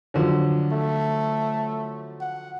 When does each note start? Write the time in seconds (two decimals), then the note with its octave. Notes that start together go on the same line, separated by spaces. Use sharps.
0.14 D3 F3 F#3
0.72 A3
2.21 F#5